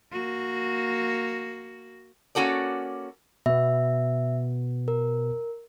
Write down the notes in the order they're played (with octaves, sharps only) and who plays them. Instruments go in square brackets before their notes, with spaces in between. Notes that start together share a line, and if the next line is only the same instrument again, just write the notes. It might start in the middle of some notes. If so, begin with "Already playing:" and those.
[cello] A#3 F#4
[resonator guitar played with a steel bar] A#3 C#4 F#4 A4 D5
[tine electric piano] B2 B3 [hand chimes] E5
[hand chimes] A#4